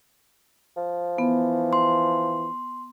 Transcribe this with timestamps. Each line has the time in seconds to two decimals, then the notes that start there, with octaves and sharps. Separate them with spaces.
0.77 F3
1.18 E3 B3
1.73 C6